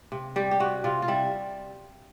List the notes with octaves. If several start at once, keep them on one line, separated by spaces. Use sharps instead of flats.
C3
G3 G4
G4
C3 F#4
C3 F4
F4
G3 E4